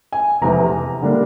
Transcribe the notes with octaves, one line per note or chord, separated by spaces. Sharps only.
G#5
F1 E2 C3 E3 A#5
D3 G3 A#3 D4